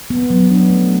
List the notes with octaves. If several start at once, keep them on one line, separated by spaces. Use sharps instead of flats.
B3
F#3
D4
A3